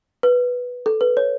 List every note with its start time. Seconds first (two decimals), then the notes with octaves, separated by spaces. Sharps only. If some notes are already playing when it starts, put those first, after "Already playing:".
0.23 B4
0.86 A4
1.01 B4
1.17 C#5